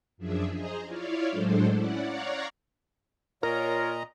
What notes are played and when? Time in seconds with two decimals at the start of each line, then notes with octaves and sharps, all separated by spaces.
0.18 F#2 F3 D4 G#4 E5
0.51 G#4 C5 D#5 A#5
0.85 E4 F4 C#5 D5 F5
1.30 A2 F#3 G#3 D4 A4 C5
1.69 C#4 E4 D5 F#5
2.01 C#5 D5 F5 F#5 A#5 C#6
3.43 A#2 F4 A#4 C#5 D#5 A#5